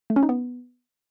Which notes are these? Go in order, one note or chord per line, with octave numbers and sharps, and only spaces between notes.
A3
C#4
D#4
B3